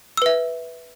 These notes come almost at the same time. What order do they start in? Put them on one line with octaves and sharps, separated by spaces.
E6 B4 E5